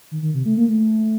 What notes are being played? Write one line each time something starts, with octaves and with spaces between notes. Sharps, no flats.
D#3
D#3
C3
A3
A#3
A3